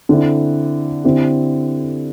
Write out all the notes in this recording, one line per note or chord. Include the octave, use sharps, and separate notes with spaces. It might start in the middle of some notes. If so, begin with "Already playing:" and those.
D3 C4 E4
D3 C4 E4 G4